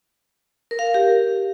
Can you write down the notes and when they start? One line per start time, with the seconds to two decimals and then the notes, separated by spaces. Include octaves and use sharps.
0.71 A#4
0.79 F5
0.87 A#4
0.94 G4